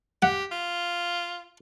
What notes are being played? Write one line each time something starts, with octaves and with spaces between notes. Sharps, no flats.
G4 F#5
F4